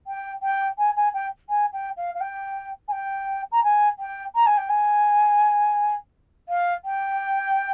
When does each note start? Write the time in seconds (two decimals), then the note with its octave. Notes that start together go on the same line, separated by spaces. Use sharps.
0.07 G5
0.43 G5
0.78 G#5
0.96 G#5
1.14 G5
1.49 G#5
1.73 G5
1.97 F5
2.15 F5
2.21 G5
2.88 G#5
2.92 G5
3.52 A#5
3.64 G#5
3.99 G5
4.35 A#5
4.46 G#5
4.58 G5
4.69 G#5
6.49 F5
6.85 G5